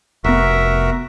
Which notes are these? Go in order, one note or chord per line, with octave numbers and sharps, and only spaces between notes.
F1 B3 F#4 A#4 E5